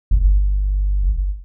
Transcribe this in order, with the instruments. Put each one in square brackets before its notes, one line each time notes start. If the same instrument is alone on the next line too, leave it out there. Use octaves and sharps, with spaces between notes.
[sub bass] G1